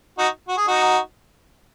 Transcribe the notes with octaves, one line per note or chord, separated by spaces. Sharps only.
D#4 F#4
F#4
G#4
D#4 F#4